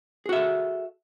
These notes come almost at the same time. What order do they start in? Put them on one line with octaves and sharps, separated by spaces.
G#4 F#4 E5 A4